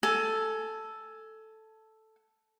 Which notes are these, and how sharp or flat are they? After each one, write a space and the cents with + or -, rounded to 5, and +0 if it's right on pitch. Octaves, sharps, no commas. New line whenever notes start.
A4 +0 G#5 +15